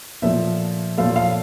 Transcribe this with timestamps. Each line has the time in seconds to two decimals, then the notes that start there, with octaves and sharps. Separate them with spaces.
0.22 A#2 F3 A3 E5
0.98 A#2 F3 A3 F5
1.16 F5